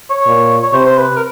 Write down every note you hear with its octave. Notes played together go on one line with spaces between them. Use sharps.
C#5
A#2
C#5
C3 C5
C5
B4
A#4